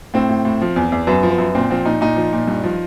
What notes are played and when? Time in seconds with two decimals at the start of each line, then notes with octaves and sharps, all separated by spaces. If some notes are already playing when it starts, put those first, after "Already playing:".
0.14 A2 C4
0.29 A2
0.45 A2
0.61 F3
0.76 E2
0.92 E2
1.07 F#2 B3
1.23 F3
1.31 B3
1.38 F#2
1.55 A#2 C4
1.70 F3 C4
1.85 A#2 D#4
2.01 A#2 D#4
2.16 F3
2.33 A#2
2.48 G2
2.63 F3